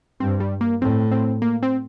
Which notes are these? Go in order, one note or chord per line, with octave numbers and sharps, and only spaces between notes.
G2 C4
G3
A#3
A2 C4
C4
A#3
C4